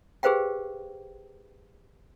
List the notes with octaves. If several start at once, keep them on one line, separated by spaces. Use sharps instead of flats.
G4 G#4 B4 C5 F5 G5